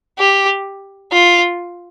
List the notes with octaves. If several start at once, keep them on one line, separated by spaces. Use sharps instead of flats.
G4
F4